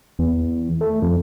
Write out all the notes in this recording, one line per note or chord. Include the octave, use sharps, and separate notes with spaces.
E2
A3
F2